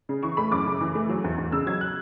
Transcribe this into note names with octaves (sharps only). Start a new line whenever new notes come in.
C#3
E3 C#6
A3 B5
F#2 D6
C#3
E3
A3
F#3
E2
E2
C#3 E6
F#3 G#6
F#6